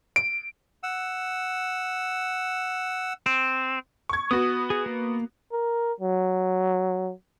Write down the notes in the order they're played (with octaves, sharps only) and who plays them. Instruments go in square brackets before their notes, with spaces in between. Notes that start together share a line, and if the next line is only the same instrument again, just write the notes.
[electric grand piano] D7
[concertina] F#5 E6
[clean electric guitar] C4
[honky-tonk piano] C#6 G#6
[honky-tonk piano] B3 F#4 [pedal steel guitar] D#6
[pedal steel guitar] G#4
A#3
[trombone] A#4
F#3